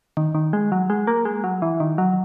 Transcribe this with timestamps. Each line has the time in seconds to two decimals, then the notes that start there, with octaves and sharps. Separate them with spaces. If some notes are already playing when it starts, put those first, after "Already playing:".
0.17 D#3
0.35 D#3
0.53 G#3
0.72 F#3
0.90 G#3
1.07 A#3
1.25 G#3
1.44 F#3
1.62 E3
1.80 D#3
1.98 F#3